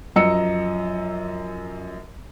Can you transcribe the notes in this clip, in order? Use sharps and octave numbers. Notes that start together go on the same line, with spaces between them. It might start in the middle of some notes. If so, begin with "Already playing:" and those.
F#2 F3 D#5 A#5 E6 C#7